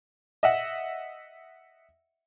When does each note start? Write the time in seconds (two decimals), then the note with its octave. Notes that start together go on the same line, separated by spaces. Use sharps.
0.43 D#5 E5 F#5